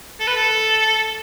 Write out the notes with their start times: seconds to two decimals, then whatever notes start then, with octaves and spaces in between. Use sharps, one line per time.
0.20 A4
0.27 B4
0.36 A4